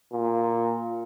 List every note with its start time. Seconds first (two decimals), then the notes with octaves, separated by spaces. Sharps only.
0.13 A#2